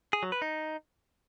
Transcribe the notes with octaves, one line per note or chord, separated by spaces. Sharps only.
G#4
F#3
B4
D#4